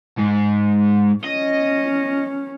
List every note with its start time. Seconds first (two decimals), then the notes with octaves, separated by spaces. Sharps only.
0.18 G#2
1.24 C#4 D#5